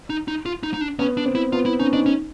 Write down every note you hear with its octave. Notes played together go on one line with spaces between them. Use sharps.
D#4
D#4
F4
D#4
D#4
D4
B3 C#4
D4
C4
E4
B3 F4
E4
C#4 D#4
D4 D#4
C#4